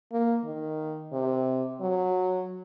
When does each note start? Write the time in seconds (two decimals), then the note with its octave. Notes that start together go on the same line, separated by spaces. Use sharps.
0.12 A#3
0.44 D#3
1.12 C3
1.80 F#3